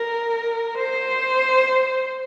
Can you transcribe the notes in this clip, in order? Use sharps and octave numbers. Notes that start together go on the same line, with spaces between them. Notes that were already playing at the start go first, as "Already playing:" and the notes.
Already playing: A#4
C5